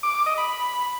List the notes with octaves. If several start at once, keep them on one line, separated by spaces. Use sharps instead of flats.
D6
D6
D#5
B5